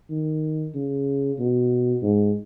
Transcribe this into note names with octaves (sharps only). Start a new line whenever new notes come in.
D#3
C#3
B2
G#2